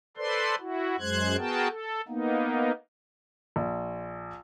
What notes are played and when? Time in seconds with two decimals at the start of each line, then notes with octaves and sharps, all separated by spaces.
0.17 A4 B4 C5 D5 C6
0.60 E4 F#4
0.99 F#2 G#3 C5 F#6 G#6
1.38 B3 F#4 G#4 A#4 G5 A5
1.69 A4
2.08 A#3 B3 D#4
3.56 A#1